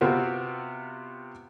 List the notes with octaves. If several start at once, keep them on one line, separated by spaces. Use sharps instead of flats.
C3 B3 C4 F4 F#4